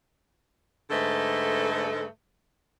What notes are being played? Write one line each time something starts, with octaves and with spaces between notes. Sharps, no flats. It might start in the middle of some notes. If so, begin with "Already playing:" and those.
G#2 D3 A3 A4 B4 D#5